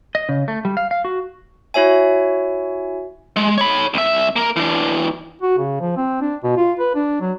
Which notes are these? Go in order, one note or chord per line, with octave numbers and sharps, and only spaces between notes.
D#5
C#3
A3
G3
F5
F5
F#4
E4 F#4 C#5 E5 G#5
G#3
C#5 B5
C2 E5
A#3 A#4
E3 D4
F#4
C#3
F3
C4
D4
B2
F4
B4
D4
F#3